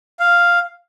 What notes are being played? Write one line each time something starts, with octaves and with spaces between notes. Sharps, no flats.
F5